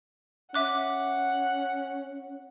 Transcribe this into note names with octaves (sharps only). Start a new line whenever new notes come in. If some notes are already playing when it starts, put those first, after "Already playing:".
C#4 E5 F#5 D6 F#6